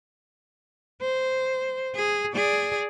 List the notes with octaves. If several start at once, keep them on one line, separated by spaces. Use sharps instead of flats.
C5
G#4
G#4 D5